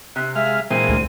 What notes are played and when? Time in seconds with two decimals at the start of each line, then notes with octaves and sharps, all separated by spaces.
0.16 C3 F#6
0.35 G#3 E5 F5 F6
0.70 A#2 E3 G#3 C4 D#7
0.89 D2